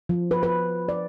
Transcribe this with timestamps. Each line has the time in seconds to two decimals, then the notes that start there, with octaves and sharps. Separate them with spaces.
0.09 F3
0.31 B4
0.43 B4
0.88 D5